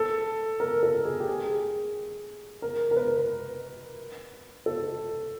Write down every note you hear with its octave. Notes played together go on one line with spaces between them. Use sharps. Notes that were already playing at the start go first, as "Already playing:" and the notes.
Already playing: A4
A#4
A4
G#4
G4
G#4
A#4
A#4
B4
A4